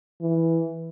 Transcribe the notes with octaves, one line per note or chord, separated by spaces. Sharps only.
E3